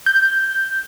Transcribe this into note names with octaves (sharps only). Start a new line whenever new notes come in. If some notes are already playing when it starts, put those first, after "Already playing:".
G6